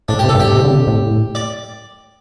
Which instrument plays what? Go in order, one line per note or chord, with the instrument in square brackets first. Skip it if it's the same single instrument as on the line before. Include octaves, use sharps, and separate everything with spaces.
[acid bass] A2 [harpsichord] D4
[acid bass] C3 [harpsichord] G4
[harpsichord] A4
[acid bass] G2
[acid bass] A2 [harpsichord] G4
[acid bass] C3
D3
C3
A2
[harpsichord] D5